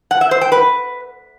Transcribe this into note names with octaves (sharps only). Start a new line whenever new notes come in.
F#5
E5
C5
G5
B4